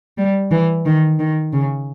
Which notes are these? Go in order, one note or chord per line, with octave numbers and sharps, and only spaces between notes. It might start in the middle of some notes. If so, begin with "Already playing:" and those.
G3
E3
D#3
D#3
C#3